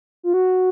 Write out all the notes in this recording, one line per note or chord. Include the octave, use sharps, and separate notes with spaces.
F4
F#4